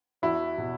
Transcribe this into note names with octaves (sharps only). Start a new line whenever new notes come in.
E2 E4 F#4
B2